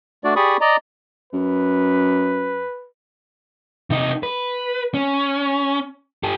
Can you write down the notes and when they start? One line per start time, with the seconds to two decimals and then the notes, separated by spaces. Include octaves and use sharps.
0.24 A3 D4 F#4 D5
0.36 G4 G#4 D5 B5 C#6 D#6
0.61 D5 D#5 A#5
1.33 F#2 B4
3.90 C3 D#4
4.23 B4
4.94 C#4
6.23 G4 A4